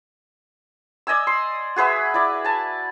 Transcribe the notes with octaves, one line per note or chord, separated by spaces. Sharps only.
D5 D#5 G#5 E6
C6
F#4 G#4 B4 E5
E4 D5
G#5 A5